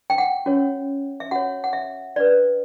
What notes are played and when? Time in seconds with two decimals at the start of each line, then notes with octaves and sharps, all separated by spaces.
0.10 G5
0.18 F#5
0.46 C#4 F#4 C#5
1.20 E5
1.31 F#4 C#5 F#5
1.64 F#5
1.73 E5
2.16 D4 F#4 B4 D5